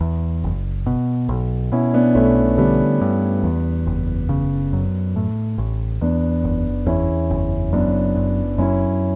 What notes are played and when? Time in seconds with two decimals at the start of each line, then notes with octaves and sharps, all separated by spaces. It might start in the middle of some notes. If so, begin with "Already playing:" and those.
0.01 E2
0.44 F#1
0.86 B2
1.29 B1
1.72 B2 C#4 E4
1.94 B3 D4
2.15 B1 A3 C#4
2.36 A3
2.58 D3 G3 B3
3.01 G2
3.43 E2
3.87 F#1
4.29 C#3
4.73 F#2
5.16 A2
5.58 A1
6.01 E2 B3 D4
6.44 F#1
6.86 E2 C#4 E4
7.30 F#1
7.73 F#2 B3 D4
8.16 F#1
8.58 F#2 C#4 E4